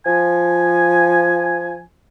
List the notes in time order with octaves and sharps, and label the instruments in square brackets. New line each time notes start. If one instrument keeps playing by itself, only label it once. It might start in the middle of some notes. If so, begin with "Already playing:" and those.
[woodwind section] F3 G#5